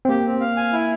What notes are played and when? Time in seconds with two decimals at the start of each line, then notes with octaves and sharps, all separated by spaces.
0.05 C4
0.09 A#3 G4
0.26 C4
0.40 F5
0.57 G#5
0.73 E4